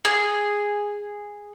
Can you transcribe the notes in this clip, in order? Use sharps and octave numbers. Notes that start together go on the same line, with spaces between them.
G#4